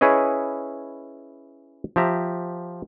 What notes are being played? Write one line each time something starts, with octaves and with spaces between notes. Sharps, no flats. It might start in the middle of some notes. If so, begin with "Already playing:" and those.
C#4 E4 G#4 B4 C#5 D#5
F3 G4 E5 A#5